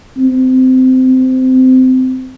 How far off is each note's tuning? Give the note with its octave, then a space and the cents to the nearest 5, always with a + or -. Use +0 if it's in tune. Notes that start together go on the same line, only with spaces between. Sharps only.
C4 -20